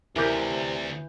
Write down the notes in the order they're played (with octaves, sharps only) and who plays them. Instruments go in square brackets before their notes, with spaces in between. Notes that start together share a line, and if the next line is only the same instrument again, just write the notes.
[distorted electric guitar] D2 [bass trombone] C3 [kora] E3 [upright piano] A#4 D6 G6